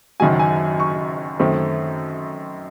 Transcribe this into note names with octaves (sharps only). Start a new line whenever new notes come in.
F#1 F#2 D#3 F#3 G#5
G#5
C#6
F#2 D#3 A3 C4